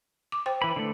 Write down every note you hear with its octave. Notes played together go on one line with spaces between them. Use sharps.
D6
C5 G5
E3 B4 B5
D3 A3